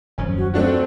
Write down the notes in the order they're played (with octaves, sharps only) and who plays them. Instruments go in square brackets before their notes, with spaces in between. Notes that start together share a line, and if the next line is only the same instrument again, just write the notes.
[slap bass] D#1 F#2 F3 [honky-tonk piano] C#4
[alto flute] F#4
[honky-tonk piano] A3 D4 F#4 [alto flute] C4